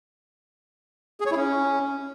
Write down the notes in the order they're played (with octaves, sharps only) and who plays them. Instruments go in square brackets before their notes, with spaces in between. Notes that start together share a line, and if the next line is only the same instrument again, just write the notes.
[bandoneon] G#4
C#5
E4
C#4